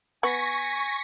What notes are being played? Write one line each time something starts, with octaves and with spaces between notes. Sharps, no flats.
B3 G#5 C#6 A#6 B6